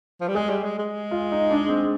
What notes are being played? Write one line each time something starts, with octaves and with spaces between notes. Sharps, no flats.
F3
G3
G#3 G#4
G3
G#3
G#3
F4
D#4
D4
C4